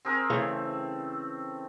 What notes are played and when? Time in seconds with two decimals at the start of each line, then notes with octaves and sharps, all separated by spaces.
0.05 C4 G#4 A#4
0.30 C#3 E3 A3 C#5